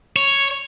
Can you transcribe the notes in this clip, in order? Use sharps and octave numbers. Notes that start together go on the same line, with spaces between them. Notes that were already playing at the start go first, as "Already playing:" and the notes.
C#5